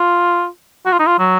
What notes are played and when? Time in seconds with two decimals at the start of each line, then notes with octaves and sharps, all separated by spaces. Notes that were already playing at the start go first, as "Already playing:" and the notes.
Already playing: F4
0.86 F#4
0.92 F4
0.99 D#4
1.07 F4
1.19 F#3